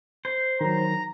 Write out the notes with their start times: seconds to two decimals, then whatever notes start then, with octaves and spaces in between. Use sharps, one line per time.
0.25 C5
0.61 D#3 F#3 A#5